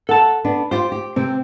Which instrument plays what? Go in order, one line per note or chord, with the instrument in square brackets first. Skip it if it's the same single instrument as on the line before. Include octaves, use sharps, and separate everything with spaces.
[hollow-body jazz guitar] A4 A5 [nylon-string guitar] F#5
[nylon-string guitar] B3 D4
[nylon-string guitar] F4 G4 [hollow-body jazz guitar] C5
[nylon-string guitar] G4
[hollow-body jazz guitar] C3 [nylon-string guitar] C4